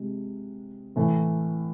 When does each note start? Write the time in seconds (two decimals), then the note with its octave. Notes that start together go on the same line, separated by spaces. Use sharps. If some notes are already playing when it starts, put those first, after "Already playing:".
Already playing: C3 G#3
0.96 A2 E3 A3